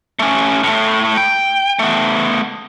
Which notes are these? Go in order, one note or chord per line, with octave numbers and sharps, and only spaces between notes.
A3 C#4
A2 A3
G5
A3 B3